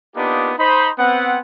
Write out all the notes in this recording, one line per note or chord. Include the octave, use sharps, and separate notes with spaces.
A#3 B3 D4 D#4 F4 G4
D#4 C5 B5
B3 C4 F#5